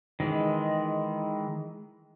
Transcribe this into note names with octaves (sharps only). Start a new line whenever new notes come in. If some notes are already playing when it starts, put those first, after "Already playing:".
D#3 E3 G#3